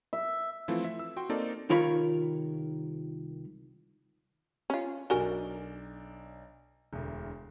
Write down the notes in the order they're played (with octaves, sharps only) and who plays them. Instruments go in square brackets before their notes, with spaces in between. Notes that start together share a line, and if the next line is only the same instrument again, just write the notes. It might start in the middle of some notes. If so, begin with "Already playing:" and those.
[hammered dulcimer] E5
[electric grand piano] E3 F3 A3 C4 E4 F4
E5
E6
F#4 G5 C6
A#3 C4 D#4 A4 D5
[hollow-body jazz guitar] C2 D#3 F4 A#4 C#5 B5
[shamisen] C#4 F4
[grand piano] B1 D4 G7 [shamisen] F#4 A#4 G#5
[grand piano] E1 D2